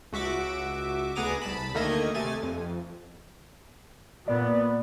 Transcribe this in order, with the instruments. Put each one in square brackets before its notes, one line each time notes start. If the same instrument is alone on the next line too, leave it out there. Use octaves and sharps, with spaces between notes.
[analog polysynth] C#2 F#4 E5 D6
D2 B3 G#4 A#5 D6 D#7
C2 A5 B5
D2 D#3 A3 A#3 D#5 G#6
C3 A3 G#5 A6
F2
[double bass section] A#2 B3 [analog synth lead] D5